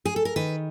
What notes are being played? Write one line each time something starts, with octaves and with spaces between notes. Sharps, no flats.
G#4
A4
A#4
D#3 B4